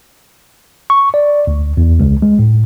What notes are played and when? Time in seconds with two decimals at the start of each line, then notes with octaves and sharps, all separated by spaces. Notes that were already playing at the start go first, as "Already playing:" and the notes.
0.90 C#6
1.14 D5
1.47 D2
1.77 E2
2.00 C#2
2.22 G#3
2.39 A2